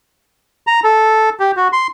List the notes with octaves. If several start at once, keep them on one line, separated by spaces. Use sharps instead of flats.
A#5
A4
G4
F#4
C6